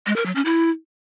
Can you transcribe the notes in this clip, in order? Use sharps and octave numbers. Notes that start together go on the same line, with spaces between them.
G#3
A#4
F#3
C#4
E4